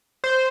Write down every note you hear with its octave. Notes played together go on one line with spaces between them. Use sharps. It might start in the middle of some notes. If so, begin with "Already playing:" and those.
C5